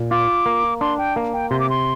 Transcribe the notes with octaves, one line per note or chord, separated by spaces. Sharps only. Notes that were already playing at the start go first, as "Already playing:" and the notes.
Already playing: A#2
F4 D6
A#3
D4 C6
G5
A#3
G5
C3 C6
D6
C6